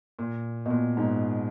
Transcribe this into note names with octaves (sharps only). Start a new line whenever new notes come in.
A#2
B2
A#2
G#2